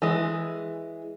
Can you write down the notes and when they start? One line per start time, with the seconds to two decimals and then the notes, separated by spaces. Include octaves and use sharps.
0.02 E3 G#3